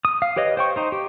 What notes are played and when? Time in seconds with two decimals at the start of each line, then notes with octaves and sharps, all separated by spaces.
0.05 D#6
0.22 F5
0.36 G4 B4 C#5 D#5
0.57 C5 G5 C#6
0.76 D#4 C5
0.92 G4